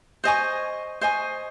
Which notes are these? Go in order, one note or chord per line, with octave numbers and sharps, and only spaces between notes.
C5 D#5 G#5 C#6
C5 D#5 G#5 C#6